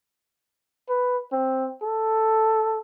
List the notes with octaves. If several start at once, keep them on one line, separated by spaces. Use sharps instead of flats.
B4
C4
A4